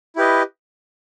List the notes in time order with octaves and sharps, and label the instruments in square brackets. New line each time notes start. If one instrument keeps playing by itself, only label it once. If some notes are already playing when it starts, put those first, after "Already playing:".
[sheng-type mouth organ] E4 G4 B4 D#5